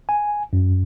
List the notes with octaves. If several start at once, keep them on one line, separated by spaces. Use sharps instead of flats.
G#5
F#2